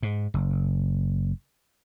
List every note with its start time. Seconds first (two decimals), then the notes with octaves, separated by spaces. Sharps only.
0.03 G#2
0.34 F#1